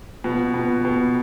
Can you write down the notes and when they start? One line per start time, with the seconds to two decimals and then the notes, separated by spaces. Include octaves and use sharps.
0.24 B2 F3
0.54 B2
0.85 B2